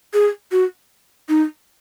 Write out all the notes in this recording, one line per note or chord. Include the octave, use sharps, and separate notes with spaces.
G#4
F#4
D#4